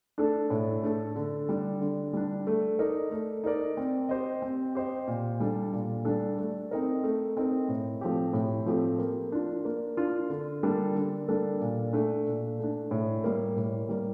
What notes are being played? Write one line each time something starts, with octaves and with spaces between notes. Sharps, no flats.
A3 D4 A4
A2
A3 D4 A4
D3
G3 D4
D3
G3 D4
A3
D#4 A#4 D5
A3
D#4 A#4 D5
C4
G4 C5 D#5
C4
G4 C5 D#5
A#2
G3 D4 A4
A#2
G3 D4 A4
A3
C4 D#4 A#4
A3
C4 D#4 A#4
A2
F3 A3 C4 G4
A2
F3 A3 C4 G4
A#3
D4 F4
A#3
D4 F4
D3
G3 A#3 D4 A4
D3
G3 A#3 D4 A4
A#2
A3 D4
A#2
A3 D4
A2
G3 A#3
A2
G3 A#3